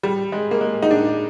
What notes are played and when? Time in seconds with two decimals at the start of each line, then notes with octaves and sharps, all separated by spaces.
0.03 G3
0.32 G#3
0.51 A#3
0.61 G#3
0.83 D#4
0.91 D4